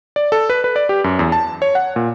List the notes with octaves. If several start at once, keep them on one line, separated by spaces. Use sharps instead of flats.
D5
A4
B4
B4
D5
G4
F#2
E2
A5
C#5
F#5
A#2